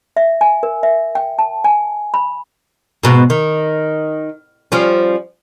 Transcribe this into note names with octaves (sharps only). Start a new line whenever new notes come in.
E5
G#5
A#4
E5
G5
A5
G#5
B5
G#2 B2 B3
D#3
F3 G3 C#4